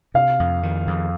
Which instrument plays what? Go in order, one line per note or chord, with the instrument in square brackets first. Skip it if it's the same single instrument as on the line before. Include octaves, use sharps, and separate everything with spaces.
[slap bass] C3 [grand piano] F5
[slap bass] F2
D#3
F2